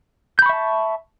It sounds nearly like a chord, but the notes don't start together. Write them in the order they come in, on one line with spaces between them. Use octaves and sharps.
G6 B5 C#6 E5 A5